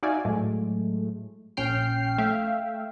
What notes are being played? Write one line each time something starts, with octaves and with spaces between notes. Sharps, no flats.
D#4 F#4 D5 E5 F5 G#5
A2 F#3 G#3 A3
A#1 C#4 G5 F6 C7
A3 E5 F5 G5